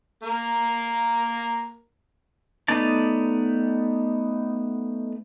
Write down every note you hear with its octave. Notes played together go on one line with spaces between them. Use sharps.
A#3 A#4
A3 B3 D#4 D5 A5